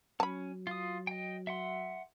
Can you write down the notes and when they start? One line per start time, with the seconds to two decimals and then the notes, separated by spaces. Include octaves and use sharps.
0.20 F#3 C#4 A5 B5
0.67 F4 D#6
1.07 D#5 G5
1.47 E5 F#5 C6